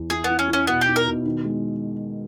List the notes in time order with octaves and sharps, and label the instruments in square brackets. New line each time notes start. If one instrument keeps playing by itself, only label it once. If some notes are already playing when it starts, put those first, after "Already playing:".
Already playing: [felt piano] E2
[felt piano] E4 [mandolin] G#4
[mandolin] B3 [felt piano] E4
[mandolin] C#4
[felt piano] E4
[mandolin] C#4
[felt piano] B2 [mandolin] B3
[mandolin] G4
[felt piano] D#4
[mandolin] A#4
[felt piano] B2
D#3
G#3